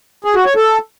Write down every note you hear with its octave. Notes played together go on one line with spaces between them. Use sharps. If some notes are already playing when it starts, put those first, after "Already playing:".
G#4
F#4
C#5
A4